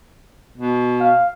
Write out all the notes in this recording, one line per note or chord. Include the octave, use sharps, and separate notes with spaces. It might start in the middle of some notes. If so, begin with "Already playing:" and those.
B2
F5